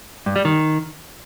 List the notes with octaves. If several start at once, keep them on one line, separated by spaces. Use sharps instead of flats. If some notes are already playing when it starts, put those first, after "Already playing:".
G2
G3
D#3